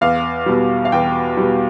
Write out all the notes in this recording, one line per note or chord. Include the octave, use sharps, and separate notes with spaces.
E2 F5
B2 G3
F5
E2 G5
B2 G3